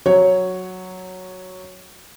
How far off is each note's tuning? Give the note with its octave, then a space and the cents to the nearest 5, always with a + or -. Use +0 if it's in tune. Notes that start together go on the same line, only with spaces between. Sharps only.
F#3 +0 C#5 +0